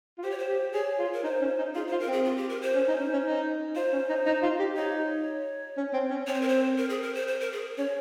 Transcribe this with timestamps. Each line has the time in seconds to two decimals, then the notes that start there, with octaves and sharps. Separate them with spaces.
0.18 F4
0.24 G4 C5
0.30 C#5
0.39 C5
0.49 G4
0.74 G#4 C#5
0.99 F4
1.13 A#4
1.24 D#4 C5
1.41 C#4
1.58 D#4
1.75 F4 G#4
1.87 C5
1.92 F4
1.99 A#4
2.08 C4 G#4
2.25 F4
2.37 G4
2.49 A#4
2.62 C5
2.75 C#4
2.88 D#4
3.00 C#4
3.13 C#4
3.25 D#4
3.75 F4 C5
3.93 C#4
4.09 D#4
4.26 D#4
4.43 F4
4.59 G4
4.76 D#4 C#5
5.77 C#4
5.93 C4
6.10 C#4
6.27 C4 C#5
6.34 C5
6.41 A#4
6.48 C5
6.77 A#4
6.89 G#4
7.02 A#4
7.15 C5
7.28 C5
7.41 A#4
7.53 G#4
7.78 C#4 C#5